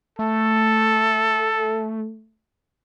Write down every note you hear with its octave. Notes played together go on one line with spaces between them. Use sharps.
A3 A4